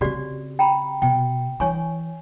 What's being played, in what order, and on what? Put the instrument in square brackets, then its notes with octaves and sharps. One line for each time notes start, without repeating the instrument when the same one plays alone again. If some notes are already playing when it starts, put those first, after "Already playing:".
[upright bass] C#3 C4 [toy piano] F#4 G4 D5
[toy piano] G5 A#5 B5
[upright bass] B2 [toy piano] G5
[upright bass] E3 D4 [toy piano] C#5 G#5 C#6